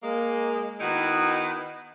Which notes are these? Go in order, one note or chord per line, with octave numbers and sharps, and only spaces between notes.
G#3 A#3
D#3 B3 D#4 E4 F#4